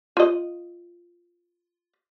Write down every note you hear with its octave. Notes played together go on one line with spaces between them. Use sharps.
F4 D#5